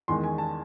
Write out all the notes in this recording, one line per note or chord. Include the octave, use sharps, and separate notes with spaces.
E2 D#3 G#3 C6
G#5
A5